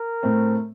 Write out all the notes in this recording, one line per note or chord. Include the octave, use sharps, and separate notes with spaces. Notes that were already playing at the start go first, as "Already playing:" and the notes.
Already playing: A#4
A2 A3 C4